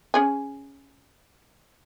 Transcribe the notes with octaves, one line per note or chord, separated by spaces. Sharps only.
C#4 G#4 G#5